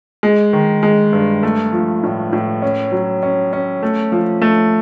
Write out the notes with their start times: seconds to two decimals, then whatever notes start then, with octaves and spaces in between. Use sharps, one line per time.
0.23 G#3
0.53 D#3
0.83 G#3
1.13 G2
1.43 A3
1.73 F3
2.03 A2
2.33 A2
2.62 C#4
2.92 F#3
3.23 C#4
3.53 C#4
3.83 A3
4.12 F3
4.42 A3